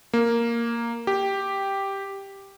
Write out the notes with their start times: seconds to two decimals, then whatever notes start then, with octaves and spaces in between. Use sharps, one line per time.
0.13 A#3
1.07 G4